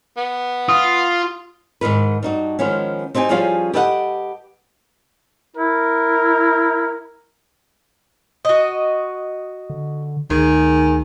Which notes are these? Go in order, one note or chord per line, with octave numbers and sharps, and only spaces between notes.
B3
F4 D#6
G#2 C3 D#3 B4
G2 D#4 F#4
D#3 F3 G#3 B3 C#4
C4 D#4 G4 G5 G#5
F3 G3 C#4 G#4 F5
G4 A4 B4 D#5 F5 F#5
E4 A#4
F#4 D#5
D3
D2 D#3 G#4